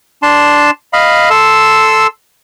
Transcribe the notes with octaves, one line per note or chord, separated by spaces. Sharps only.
D4 A5 C6
D#5 F5 B5
A4 C6 E6